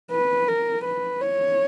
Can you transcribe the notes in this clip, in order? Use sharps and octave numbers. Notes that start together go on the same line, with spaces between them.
B4
A#4
B4
C#5